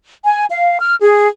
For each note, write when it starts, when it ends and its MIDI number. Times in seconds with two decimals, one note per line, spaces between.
0.24 0.45 80
0.49 0.78 77
0.80 0.96 89
1.01 1.29 68